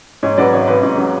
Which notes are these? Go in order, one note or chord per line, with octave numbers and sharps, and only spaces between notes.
G#2 C#5
F#3 B4 D5
G#1 C#5
G#1 B4
G#2
F#3